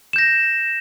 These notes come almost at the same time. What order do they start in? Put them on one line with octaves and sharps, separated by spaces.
E7 G6 A#6